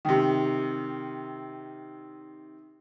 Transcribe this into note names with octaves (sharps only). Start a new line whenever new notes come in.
C3 D#3